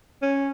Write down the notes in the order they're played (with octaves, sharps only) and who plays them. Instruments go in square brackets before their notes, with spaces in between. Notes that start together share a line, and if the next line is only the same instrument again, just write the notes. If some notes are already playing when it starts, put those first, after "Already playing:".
[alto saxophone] C#4